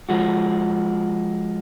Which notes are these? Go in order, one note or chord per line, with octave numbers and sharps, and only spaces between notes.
F3 G#3 F#4